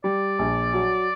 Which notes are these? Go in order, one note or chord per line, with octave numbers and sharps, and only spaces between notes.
G3 D5
A#1
F#3